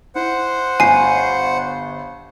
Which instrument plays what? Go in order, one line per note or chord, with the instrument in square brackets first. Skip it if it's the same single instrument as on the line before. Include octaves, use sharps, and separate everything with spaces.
[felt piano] E4 [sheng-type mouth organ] C5 F#5
[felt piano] G1 [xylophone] G#5 C7